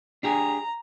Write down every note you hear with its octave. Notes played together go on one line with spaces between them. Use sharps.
D4 G4 G#4 A#5